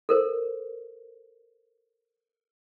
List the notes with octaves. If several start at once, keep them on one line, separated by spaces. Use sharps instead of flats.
A4 A#4 C5